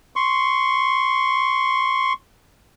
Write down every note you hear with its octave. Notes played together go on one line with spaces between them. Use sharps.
C6 C#6